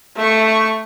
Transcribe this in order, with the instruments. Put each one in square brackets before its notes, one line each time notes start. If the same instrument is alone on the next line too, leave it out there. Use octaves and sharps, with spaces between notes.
[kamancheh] A3 C#6